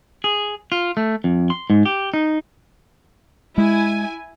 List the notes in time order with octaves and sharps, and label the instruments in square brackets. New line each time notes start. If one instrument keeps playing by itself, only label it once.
[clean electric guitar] G#4
F4
A3
F2
C6
G#2
G4
D#4
[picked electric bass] G#3 [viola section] E4 G#5